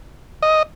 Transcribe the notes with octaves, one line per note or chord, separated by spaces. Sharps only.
D#5